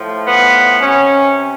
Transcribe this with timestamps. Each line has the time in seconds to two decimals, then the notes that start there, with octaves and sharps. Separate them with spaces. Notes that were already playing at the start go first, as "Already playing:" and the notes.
Already playing: A2 F3
0.27 B3
0.81 C3 C#4